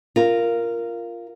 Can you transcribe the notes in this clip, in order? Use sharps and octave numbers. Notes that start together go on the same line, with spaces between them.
F4 A#4